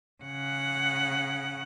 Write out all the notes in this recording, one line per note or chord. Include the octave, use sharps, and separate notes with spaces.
C#3 F#5